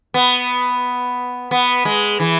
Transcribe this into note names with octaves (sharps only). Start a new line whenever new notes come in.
B3
B3
G#3
E3